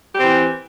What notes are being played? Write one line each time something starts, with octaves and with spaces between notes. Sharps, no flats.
E3 C4 G4